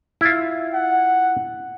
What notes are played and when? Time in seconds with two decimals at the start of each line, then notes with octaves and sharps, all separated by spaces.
0.21 E4 F4
0.74 F#5